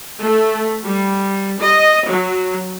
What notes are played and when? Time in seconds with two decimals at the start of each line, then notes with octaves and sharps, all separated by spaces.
0.21 A3
0.85 G3
1.59 D#5
2.10 F#3